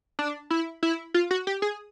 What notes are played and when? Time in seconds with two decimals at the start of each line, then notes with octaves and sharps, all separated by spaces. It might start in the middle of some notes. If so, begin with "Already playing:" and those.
0.19 D4
0.50 E4
0.83 E4
1.14 F4
1.31 F#4
1.47 G4
1.62 G#4